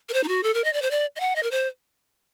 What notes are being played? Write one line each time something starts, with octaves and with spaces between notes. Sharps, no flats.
A#4
C5
D#4
F#4
A4
A#4
D#5
D5
C5
D5
D#5
F#5
D#5
A#4
C5